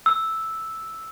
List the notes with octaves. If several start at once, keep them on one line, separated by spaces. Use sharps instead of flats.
E6